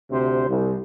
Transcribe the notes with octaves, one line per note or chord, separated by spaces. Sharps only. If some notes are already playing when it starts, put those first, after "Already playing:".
D2 C3 C5
C2